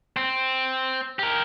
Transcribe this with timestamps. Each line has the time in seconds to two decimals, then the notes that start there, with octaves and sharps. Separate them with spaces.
0.17 C4
1.19 G4 A#4